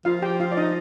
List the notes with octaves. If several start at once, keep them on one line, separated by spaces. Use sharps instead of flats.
F3 F4 F5
G4 G5
F4 F5
D5
D#4 D#5